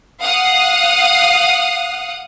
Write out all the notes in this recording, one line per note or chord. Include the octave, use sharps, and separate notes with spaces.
F5 F#5 D#6